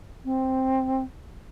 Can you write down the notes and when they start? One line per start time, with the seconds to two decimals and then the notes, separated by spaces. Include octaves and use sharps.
0.25 C4